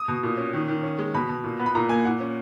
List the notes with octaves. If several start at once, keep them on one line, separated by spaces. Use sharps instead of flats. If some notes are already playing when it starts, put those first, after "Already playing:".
Already playing: D#6
B2
A#2
C#4
D#3
D#3
C#4
G#3
B2 B5
B2
A#2
B3
B5
A#2 A#5
A#3 G#5
A#2 F#5
C#4